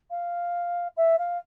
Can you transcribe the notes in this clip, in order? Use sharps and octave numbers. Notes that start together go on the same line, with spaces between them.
F5
E5
F5